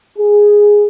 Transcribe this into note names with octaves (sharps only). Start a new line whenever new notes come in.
G#4